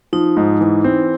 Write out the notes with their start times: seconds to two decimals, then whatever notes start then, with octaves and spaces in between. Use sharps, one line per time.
0.13 F3 D#4
0.37 G#2
0.61 E3
0.84 C4